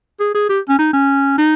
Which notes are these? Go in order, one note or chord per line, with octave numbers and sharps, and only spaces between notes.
G#4
G#4
G4
C#4
D#4
C#4
D#4